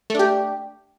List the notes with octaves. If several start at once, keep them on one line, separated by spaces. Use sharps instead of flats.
A3 D4 G4